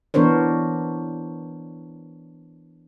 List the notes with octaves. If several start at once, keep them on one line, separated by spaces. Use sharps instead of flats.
E3 B3 D4 A#4 C5 C#5